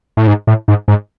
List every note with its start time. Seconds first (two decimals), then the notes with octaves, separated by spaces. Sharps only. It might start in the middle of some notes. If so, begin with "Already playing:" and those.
0.17 A2
0.27 G#2
0.47 A2
0.68 G#2
0.88 G#2